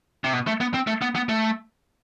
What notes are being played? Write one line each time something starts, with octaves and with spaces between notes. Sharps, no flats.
C3
B2
A3
B3
C4
A3
B3
B3
A3